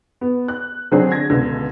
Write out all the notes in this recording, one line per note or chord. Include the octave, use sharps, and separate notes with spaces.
B3
F#6
D3 F#3 C4 D4 F#4 G#4
G#6 A#6
C#2 B2 D3